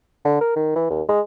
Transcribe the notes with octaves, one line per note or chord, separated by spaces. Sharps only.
D3
A#4
D#3
E3
D#2
G#3